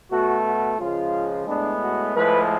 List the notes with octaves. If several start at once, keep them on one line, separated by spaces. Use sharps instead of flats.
B2 A3 F#4
F#4
C#2 C#3 F3 G#3 F4
A2 G#3 B3 D4
F#4
A2 F3 G#3 B4